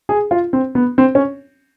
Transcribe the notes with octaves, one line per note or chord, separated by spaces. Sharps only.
G#4
F4
C4
B3
C4
C#4